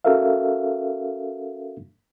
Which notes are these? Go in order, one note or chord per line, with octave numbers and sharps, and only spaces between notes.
C#4 F#4 A4 A#4 E5 F5